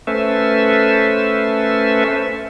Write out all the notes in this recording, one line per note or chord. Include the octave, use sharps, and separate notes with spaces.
A3 C#4 A4 B4 C5 E5